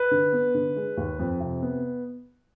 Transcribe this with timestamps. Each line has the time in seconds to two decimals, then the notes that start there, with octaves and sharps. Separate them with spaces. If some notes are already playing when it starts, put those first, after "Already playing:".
Already playing: B4
0.11 D3
0.33 B3
0.54 D3
0.76 G#3
0.97 D#2
1.19 F2
1.40 C3
1.62 B3